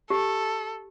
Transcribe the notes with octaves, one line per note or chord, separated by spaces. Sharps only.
G4 A4